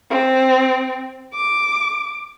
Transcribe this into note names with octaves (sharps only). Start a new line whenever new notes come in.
C4
D6